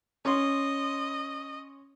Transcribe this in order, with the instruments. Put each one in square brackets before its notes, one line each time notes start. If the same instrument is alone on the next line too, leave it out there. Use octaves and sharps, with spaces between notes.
[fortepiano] C#4 C6 [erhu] D#5